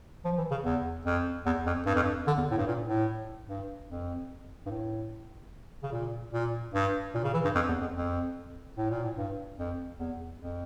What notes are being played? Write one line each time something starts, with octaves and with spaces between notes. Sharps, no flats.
F3
E3
C#3
E2
F2
E2
F2
G2
F2
G2
D3
E2
A2
G2
A#2
A2
G2
F2
G2
A2
C#3
A#2
A#2
G2
A#2
C#3
E3
G2
F2
E2
F2
F2
A2
A#2
A2
G2
F2
E2
F2